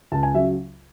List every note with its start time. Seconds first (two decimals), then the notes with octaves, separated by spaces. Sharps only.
0.12 C#2 A5
0.23 G#5
0.34 C#3 F#3 E5